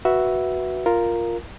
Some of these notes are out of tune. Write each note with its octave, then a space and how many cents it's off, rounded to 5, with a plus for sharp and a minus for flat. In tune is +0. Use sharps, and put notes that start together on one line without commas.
F#4 +0 B4 -15 E5 +0
F4 +0 A#4 +0